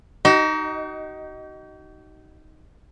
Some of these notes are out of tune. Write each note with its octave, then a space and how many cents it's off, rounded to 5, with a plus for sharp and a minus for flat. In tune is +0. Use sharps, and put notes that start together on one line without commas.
D#4 +0 F#4 +45